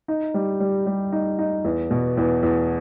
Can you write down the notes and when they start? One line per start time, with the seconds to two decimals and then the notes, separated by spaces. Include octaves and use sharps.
0.08 D#4
0.34 G3
0.60 G3
0.86 G3
1.12 D#4
1.39 D#4
1.64 E2
1.91 B2
2.17 E2
2.43 E2